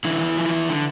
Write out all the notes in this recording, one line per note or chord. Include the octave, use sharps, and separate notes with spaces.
D3 E3 E4
E2
F3
E2
D3